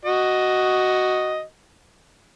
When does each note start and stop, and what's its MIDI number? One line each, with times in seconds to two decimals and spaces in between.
0.05 1.42 66
0.05 1.42 75